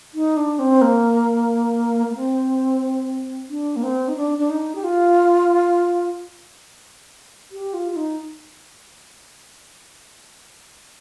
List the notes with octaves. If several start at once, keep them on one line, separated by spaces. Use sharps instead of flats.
D#4
D4
C4
A#3
A#3
C4
D4
A#3
C4
D#4
D4
D4
D#4
G4
F4
G4
F4
F4
D#4